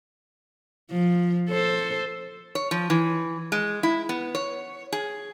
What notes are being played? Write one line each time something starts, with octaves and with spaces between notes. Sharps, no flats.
F3
A4 C5
C#5
F3
E3
G#3
E4
B3
C#5
G#4